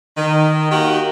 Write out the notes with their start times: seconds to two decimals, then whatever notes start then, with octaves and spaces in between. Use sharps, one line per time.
0.17 D#3
0.71 D#3 A#3 F#4 G4 A#4 G5